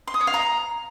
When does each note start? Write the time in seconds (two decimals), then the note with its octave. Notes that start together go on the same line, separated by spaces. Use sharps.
0.07 C6
0.14 D#6
0.21 C#5
0.27 F5
0.34 A#5